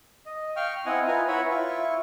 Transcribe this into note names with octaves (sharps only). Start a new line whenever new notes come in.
D#5
F5 G5 C#6 F6
C4 E4 D#5 F#5 G#5
F4 B4 G#5 A#5
E4 B4 C#5 E5 F#5 B5
E4 F4 C#6